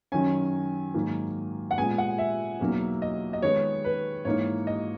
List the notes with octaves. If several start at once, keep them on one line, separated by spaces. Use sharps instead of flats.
F#2 D#3 F#3 C#4 G#5
G#2 D#3 F#3 A#3 D#4
F#5
A#2 G#3 B3 G#5
F#5
E5
E2 B2 F#3 A#3 D#4
D#5
D#5
D#3 G#3 B3 C#5
B4
G#2 E3 A#3 D#4 C#5
D#5